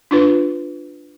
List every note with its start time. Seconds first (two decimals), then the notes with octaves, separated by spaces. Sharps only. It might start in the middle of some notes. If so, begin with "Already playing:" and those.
0.11 D4 F4 B4